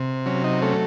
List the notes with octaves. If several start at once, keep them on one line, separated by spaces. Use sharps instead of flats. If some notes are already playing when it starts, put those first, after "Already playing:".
Already playing: C3
F#3 C#4
D#4
A3 C#4